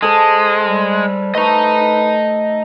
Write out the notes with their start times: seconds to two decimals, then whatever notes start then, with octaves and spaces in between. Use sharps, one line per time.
0.03 G#3 A4 C5 D#6
0.68 G3
1.35 A3 B4 D#5 A#5